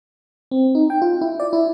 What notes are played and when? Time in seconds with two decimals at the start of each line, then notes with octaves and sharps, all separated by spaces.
0.51 C4
0.75 D#4
0.90 G5
1.02 F4
1.21 E4
1.40 D5
1.53 E4